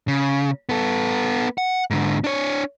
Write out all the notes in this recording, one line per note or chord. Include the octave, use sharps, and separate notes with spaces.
C#3
B3 A4
F#5
G#2 D3
D4 C#5